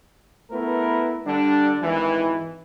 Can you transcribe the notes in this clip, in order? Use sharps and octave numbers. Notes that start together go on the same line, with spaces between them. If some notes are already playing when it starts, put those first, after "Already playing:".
A3 B3 E4 A#4 B4
D3 G3 D4
G#1 E3